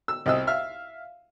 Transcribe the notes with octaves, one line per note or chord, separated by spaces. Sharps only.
E6
C2 D#5 E6
E5 F5 F6